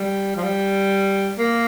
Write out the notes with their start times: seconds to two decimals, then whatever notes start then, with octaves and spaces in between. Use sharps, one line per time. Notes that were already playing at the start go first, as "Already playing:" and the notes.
Already playing: G3
0.36 F3
0.43 G3
1.38 A#3